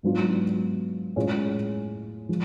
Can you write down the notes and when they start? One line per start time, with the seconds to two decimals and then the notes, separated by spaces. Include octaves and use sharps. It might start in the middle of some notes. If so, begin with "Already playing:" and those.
0.03 G#2 F#3 B3 D4 F4
1.16 A2 G#3 C#4 F4
2.29 F3 G#3